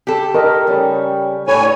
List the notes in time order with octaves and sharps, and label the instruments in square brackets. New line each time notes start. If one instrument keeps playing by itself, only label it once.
[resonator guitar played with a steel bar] G4 A4
[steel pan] A#4 D#5
[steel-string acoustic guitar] C#3 G3 C#4
[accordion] A2 C#5 G#5 [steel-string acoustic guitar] D4 B4